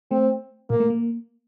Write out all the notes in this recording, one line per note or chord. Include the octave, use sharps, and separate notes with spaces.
A3 C4
A#2 A#3
A3
A#3